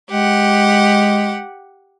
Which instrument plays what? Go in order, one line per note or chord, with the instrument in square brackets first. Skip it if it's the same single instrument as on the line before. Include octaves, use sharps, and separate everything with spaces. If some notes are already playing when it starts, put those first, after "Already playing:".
[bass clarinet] G#3 [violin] G4 F#5